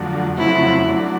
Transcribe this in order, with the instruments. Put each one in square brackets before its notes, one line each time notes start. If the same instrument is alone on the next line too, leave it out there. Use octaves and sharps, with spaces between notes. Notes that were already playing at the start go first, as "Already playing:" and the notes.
Already playing: [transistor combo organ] F2 D3 F#3 A3
[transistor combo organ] F2 C#3 F#3 A3 C4 [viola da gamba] E4
[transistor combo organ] F#3 A3 D4